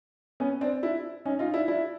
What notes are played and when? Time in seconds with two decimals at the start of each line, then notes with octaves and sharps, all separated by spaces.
0.40 B3 C#4
0.61 C4 D4
0.83 D4 E4
1.25 C#4 D#4
1.39 D#4 F4
1.53 D4 E4
1.68 D4 E4